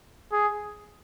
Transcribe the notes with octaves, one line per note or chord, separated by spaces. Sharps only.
G#4